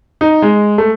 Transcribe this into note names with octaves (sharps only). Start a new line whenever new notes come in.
D#4
G#3
A3